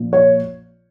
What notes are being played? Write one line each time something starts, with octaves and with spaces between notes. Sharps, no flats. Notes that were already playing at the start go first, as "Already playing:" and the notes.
Already playing: A#1 A#2 F3
C#5